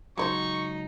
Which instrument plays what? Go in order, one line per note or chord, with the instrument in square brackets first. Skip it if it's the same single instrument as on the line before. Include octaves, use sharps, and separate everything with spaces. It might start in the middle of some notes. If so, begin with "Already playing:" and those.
[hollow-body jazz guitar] C#2 G2 F#3 [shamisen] G#3 A#4 C5 [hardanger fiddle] D#4 [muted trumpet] C#6